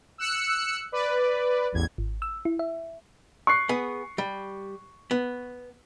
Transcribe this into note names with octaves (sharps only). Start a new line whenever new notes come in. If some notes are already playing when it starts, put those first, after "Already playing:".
E6 F#6 C#7
B4 D5
A1 E2 G#6
G#1
E6
E4
E5
C#6 F#6 C7
B3 G#4
G3
B3